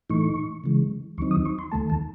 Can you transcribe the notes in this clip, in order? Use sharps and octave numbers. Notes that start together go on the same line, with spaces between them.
A2 E3 A3 D#4 C#6
C#3 E3 G#3
D#2 D#3 F#3 C4 D#4 C#6
D#6
C#6
C6
D#2 D#3 A3 A5
A5